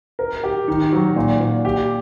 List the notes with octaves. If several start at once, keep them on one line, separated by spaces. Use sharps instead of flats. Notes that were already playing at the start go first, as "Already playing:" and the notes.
A#4
G4
D#3
F#3
A#2
A#2
G4